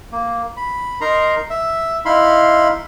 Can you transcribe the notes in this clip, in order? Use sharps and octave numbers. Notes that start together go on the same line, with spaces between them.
A#3
B5
D#4 A#4 A#5 C6
E5
D#4 E4 F5 B5 C6